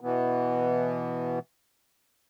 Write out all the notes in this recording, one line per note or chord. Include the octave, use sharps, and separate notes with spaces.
B2 E3 B3